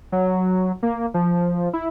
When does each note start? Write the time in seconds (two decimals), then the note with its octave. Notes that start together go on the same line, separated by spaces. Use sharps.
0.12 F#3
0.83 A#3
1.14 F3
1.73 E4